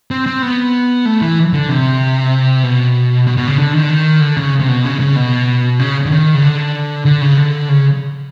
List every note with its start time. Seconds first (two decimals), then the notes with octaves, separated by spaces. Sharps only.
0.11 C4
0.26 C4
0.42 B3
1.05 A3
1.21 E3
1.53 D3
1.69 C3
2.63 B2
3.27 B2
3.37 B2
3.48 C#3
3.58 D3
3.74 D#3
3.83 D3
3.89 D#3
4.21 D3
4.37 C#3
4.60 C3
4.68 B2
4.85 C#3
5.00 C#3
5.16 B2
5.79 C#3
6.05 D3
6.11 D#3
6.35 C#3
6.42 D3
7.05 D3
7.21 C#3
7.37 D3
7.69 C#3